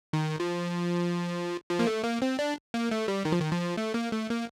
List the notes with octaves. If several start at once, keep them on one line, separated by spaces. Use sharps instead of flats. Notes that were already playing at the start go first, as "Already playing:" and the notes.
D#3
F3
F3
A#3
A3
A#3
C4
D4
A#3
A3
G3
D#3
F3
D#3
F3
A3
A#3
A3
A#3